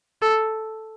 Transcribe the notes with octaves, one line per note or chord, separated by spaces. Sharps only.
A4